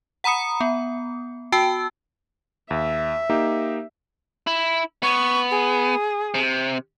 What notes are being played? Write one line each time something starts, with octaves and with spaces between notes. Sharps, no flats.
F#5 A#5 B5 D#6 C#7
B3
F#4 G5 A5 E6
D#2 E5
A#3 D#4 G4
E4
B3 C#6
G#4
C3